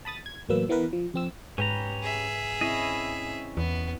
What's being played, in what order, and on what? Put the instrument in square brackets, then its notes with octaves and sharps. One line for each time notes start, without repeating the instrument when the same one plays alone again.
[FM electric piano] A5 B5 D#6 A6
G#6
A1 F#3 A#3 B4 E6
E3 B3 E4 A#4 B4
F3
F2 C4 E6
[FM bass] G#2 [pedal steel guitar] C#4 G4 A#5 [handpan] B4
[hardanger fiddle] G#4 E5
[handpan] C4 E4 [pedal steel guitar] C#4 D#5
[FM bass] E2 [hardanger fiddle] B3